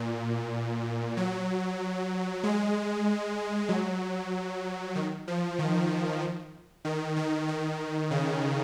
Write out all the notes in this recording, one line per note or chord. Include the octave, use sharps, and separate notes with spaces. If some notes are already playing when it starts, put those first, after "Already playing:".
Already playing: A#2
F#3
G#3
F#3
D#3
F3
D#3
D#3
D#3
D#3
C#3